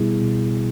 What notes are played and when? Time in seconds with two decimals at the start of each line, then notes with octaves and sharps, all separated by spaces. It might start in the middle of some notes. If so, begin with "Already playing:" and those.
Already playing: B2 G3 B3 E4 G#4
0.22 B2